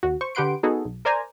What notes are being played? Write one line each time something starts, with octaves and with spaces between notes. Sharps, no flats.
D#2 F#4
C5 C#6
D3 G4 B4 F#5 C6 D7
B3 D#4 F#4 G#4 A4
B1
A#4 C5 D5 G#5 A#5